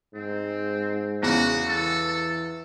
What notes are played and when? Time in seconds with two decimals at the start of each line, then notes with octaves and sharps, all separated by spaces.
0.15 G#2 C4
1.23 E2 C#3 F#4
1.68 E3 A4